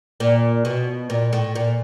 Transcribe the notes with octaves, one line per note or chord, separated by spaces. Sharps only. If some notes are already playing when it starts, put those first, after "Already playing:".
A#2
B2
A#2
A2
A#2